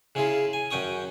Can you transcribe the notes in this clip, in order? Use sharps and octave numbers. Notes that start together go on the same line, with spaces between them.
C#3 C#4 E4 F4 G#4
G#5
F#2 C#4 G5 C#6 D#6